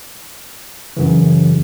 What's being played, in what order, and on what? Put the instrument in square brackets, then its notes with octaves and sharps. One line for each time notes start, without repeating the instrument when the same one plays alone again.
[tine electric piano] F#2 C#3 E3